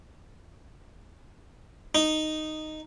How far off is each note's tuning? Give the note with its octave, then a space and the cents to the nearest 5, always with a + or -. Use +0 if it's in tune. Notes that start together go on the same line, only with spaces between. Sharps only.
D#4 -5